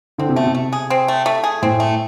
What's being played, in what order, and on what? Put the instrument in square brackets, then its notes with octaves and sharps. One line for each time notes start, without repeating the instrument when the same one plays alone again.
[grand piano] D3 [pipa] C4
[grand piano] C3
[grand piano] B2 [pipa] A3
[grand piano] C3
[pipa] A3
G#4
C4
A3
A3
G#4
[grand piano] A2 [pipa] C4
[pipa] A3